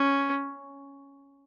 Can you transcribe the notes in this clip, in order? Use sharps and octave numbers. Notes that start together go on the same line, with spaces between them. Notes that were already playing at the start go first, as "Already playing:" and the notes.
Already playing: C#4